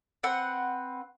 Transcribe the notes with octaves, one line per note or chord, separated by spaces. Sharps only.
C4 B4 F#5